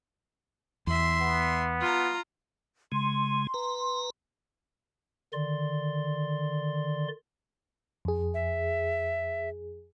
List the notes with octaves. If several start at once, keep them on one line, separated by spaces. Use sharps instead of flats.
E2 E5 C6
B3
F4 A#5
C#3 G#3 C6
B4 A#5
D3 D#3 D5 C6
F2 G#4
E5